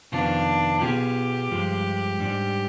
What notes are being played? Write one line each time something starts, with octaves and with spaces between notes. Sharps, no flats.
F2 C3 D#3 B3 D4 F4
B2 B3 F4 G4 G#4
G2 F3 G#3
G#2 G3 D4